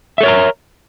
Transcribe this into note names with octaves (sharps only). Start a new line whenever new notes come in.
A4 A#4 C#5 E5 A#5